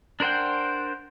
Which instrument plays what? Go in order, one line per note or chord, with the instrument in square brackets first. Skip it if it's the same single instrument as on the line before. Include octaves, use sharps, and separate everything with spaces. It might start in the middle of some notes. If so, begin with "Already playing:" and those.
[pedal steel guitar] D4 A#4 C5 F#5 G5